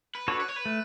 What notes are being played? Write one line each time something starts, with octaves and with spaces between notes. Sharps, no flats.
B4
D4 F#4 A4 C#5
B4
C#5
B4
A3